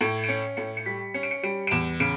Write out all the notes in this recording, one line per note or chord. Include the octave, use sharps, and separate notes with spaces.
A2 D7
D7
C#4 C#7
A2 C#7
C#7
G3 B6
C#4 C#7
D7
C#7
G3 D7
D7
E2 E7
C#3 D7